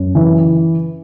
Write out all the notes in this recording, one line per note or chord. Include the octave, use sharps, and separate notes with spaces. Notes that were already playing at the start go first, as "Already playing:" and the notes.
Already playing: F#2
E3